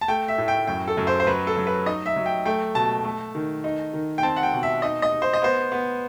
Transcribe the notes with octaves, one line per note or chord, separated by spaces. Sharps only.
A5
A3 G5
E5
A2
G5
F#2 G5
A4
F#2
C5
C5
F#3 B4
A4
F#3
B4
D#4 D#5
E5
F#3
G5
A3 G5
B2 A5
A3
D#3
D#4
D#3
G5
C4 A5
F#5
G5
B2
E5
D#4 D#5
D#5
D#4
C5
D#5
B3 C5
B3